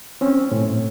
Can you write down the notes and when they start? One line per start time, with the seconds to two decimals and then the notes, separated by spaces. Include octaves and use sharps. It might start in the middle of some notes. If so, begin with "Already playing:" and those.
0.21 C4 C#4
0.52 A2